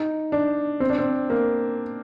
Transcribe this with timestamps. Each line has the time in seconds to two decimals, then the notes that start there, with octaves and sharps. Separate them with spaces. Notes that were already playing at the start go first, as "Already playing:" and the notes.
Already playing: D#4
0.32 D4
0.80 C4
0.90 D4
0.98 C4
1.30 A#3